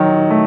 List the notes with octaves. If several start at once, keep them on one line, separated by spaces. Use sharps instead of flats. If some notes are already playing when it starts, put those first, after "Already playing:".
Already playing: D#3 F#3
A3